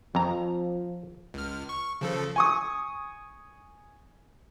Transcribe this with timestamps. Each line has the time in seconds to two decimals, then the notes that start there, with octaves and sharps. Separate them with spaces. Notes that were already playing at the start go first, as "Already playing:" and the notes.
0.15 F2 F3 A#5
1.34 C#2 F6
1.69 C#6
2.01 C#3 F3 A4
2.36 G#5 C#6 D#6